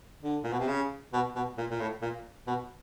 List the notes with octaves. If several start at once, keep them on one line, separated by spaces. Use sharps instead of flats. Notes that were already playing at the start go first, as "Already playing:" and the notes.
D3
A#2
B2
C3
C#3
B2
B2
A#2
A#2
A2
A#2
B2